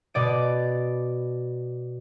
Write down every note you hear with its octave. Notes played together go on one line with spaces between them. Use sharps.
B2 D5 D#7